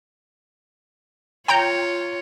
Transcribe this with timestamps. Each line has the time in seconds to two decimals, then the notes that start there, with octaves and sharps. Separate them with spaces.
1.48 F4 C#5 G5 A#5 G6